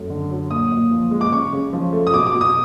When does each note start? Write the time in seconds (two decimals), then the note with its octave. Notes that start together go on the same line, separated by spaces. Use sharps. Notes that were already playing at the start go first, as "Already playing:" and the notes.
Already playing: F#2 A3
0.10 D3
0.31 F#3
0.51 A#2 D#6
0.72 A#2
0.91 F3
1.11 G#3
1.21 D6
1.32 C#3 C#6
1.53 C#3
1.73 F3
1.93 A3
2.07 D#6
2.14 B2 D6
2.27 D6
2.34 B2
2.41 D#6